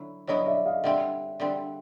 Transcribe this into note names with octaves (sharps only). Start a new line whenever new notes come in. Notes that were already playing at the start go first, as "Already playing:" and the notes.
Already playing: D3 F#3 E4
D3 F#3 B3 E4 C#5 D#5
D5 E5
D#5 F5
D3 G3 C4 E5 F#5
D3 G3 C4